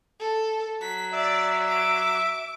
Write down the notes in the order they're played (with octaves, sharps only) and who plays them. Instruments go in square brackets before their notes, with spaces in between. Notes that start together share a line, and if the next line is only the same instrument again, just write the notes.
[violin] A4
[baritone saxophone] F#3 [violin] B6
[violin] D5 [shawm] E5
[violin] D6